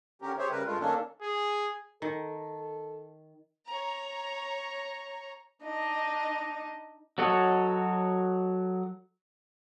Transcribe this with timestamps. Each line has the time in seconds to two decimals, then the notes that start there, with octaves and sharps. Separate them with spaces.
0.22 D3 C#4 G4 A#4
0.38 G4 G#4 C5 C#5 E5
0.51 C#3 G3 A#4 B4
0.66 G2 G#3 A3 F4
0.80 D#3 A#3 C#4 D4 A4
1.22 G#4
2.02 D#3 A4
3.67 C#5 A#5
5.64 D4 D#4 D#5
7.18 F#3 F#4 A4 C#5 D#5